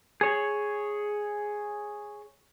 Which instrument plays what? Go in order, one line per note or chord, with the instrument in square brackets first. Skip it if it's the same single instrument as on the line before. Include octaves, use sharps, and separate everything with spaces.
[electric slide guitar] G#4 C#5